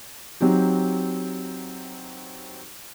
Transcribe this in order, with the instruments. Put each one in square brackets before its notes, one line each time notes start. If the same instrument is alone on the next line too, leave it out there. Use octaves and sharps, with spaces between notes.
[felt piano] F#3 C4 D#4 G4